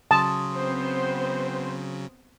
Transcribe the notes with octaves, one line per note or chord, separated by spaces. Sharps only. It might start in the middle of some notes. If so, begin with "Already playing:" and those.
C#3 F#3 A5 C6 D#6
B3 C4 C5